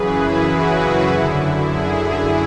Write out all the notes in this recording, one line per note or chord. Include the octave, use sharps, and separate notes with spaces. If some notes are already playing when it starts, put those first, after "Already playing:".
Already playing: F#2 C#3 E3 G#4 B4
E4 G#4
F#4
F#2 D3 E4
E4 G#4